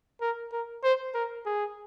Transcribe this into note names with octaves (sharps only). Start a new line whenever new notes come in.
A#4
A#4
C5
A#4
G#4